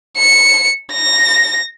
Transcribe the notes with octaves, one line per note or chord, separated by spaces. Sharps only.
C#7
A#6